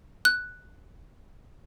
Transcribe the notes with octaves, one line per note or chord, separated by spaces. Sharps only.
F#6